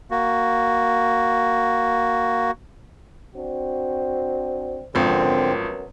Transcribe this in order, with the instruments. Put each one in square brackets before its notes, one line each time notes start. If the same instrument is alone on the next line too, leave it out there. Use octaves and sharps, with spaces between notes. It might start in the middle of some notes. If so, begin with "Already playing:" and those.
[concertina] A#3 F#4
[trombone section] C4 D4 F#4
[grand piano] G#1 F3 [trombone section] F#2 B3 A#4 [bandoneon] D3 C4